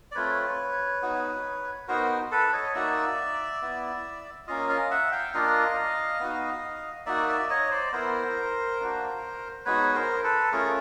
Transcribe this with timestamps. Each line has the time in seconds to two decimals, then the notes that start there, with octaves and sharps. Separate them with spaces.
0.11 D5
0.15 A3 C4 F4 B4 C#5
1.02 B3 D#4 F#4
1.88 B3 D#4 F#4 A#4 C5
2.31 A4 B4
2.53 C#5 D#5
2.74 A#3 D#4 F#4 D5 E5
3.62 B3 E4
4.47 A#3 C#4 F4 D#5 F5
4.69 D#5 F5
4.91 E5 F#5
5.12 F5 G5
5.34 A#3 D4 F4 D#5 F5
6.20 B3 D#4 F#4
7.06 A#3 D#4 F#4 D5 E5
7.28 D5 E5
7.49 C#5 D#5
7.71 C5 D5
7.92 B3 E4 A#4 C5
8.80 A#3 D4 F#4
9.65 G#3 B3 D#4 F#4 B4 C#5
9.94 A#4 C5
10.24 A4 B4
10.52 A3 C#4 F4 G#4 A#4